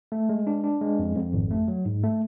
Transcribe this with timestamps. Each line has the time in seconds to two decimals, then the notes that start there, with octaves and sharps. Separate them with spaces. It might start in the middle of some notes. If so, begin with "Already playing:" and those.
0.12 A3
0.29 G#3
0.47 D4
0.64 D4
0.81 G#3
0.99 F2
1.15 F2
1.33 G#1
1.51 A3
1.68 F#3
1.85 G#2
2.04 A3